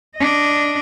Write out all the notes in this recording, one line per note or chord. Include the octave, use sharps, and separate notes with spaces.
D4 D#5